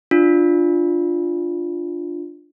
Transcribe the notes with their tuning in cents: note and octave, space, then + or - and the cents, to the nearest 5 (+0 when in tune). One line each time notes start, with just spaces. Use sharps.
D4 +10 F4 +0